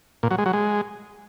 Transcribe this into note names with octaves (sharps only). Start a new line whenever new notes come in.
A#2
F#3
G#3
F#3
G#3